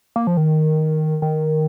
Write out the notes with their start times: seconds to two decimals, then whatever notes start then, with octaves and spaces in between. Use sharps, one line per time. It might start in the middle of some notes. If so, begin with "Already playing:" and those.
0.16 A#3
0.27 F3
0.37 D#3
1.22 D#3